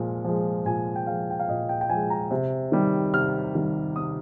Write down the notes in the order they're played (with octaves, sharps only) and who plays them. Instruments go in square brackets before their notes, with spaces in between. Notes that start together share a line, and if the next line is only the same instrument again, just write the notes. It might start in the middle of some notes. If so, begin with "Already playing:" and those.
Already playing: [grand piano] A#2 F3 G#3
F3 G#3
A#2 G#5
G5
F3 G#3 F5
G5
F5
A#2 D#5
G5
G5
F3 G#3 G#5
A#5
C3
D#3 G3
C3 F6
D#3 G3
C3 D#6